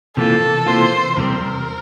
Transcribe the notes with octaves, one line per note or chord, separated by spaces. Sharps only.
C3 E3 A#3 F4 A4
C3 E3 A#3 F4 C5
E2 C3 G3 C4 A#4